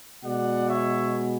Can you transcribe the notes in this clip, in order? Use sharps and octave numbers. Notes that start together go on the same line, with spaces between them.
B2 G#3 B3 D5 F#5
C#5 E5